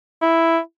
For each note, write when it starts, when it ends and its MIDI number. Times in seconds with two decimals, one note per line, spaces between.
0.22 0.58 64